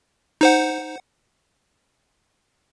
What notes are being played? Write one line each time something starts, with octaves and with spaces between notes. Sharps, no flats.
D#4 C5 F#5